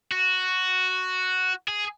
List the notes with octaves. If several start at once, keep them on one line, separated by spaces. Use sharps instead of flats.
F#4
G#4